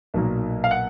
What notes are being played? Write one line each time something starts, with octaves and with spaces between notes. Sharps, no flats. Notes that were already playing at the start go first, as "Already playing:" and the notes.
B1 A#2 F#3 A#3 D#4
F5
F#5